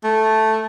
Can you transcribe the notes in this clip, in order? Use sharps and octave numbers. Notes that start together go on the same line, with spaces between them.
A3